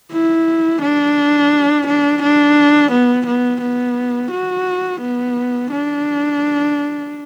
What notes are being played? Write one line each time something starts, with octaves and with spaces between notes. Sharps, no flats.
E4
D4
D4
D4
B3
B3
B3
F#4
B3
D4